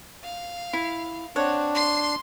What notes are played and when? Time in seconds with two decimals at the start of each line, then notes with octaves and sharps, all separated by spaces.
0.24 F5
0.73 E4
1.36 C4 D4 C#5 F#5
1.75 C6 C7